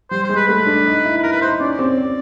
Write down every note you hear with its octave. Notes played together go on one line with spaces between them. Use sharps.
G3 C5
C5
G#3
B4
A3 B4
D4
D#4
E4
B4
E4 A#4
B4
D#4 C5
C#4 D5
C4
C4